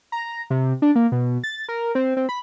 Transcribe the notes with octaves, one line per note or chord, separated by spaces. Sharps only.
A#5
C3
D4
A#3
B2
A6
A#4
C4
C4
B5